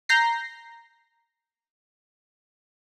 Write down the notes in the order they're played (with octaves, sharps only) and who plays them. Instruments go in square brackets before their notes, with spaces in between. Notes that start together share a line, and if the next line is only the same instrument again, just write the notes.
[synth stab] A#5 G6 A#6 C7